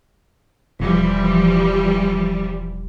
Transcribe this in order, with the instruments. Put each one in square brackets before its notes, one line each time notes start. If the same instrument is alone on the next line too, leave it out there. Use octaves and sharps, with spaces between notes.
[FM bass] E1 [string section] E3 F3 G3